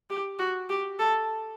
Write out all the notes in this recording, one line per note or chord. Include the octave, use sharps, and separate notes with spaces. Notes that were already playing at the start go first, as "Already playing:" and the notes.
G4
F#4
G4
A4